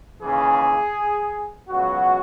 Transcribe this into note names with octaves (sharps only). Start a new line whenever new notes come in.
D#2 C#3 E3 G#4
C#2 B2 F#3 F#4